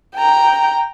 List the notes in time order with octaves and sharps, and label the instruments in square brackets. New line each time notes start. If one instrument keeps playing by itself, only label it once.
[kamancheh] G5 A#5